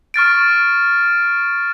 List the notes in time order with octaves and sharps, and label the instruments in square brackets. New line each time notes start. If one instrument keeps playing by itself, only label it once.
[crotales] C#6 F6 A6 D7